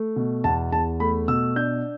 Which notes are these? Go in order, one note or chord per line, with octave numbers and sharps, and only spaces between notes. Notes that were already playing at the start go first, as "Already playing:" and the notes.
Already playing: A3
B2
E2 A5
E2 A5
A3 B5
B2 E6
D4 G6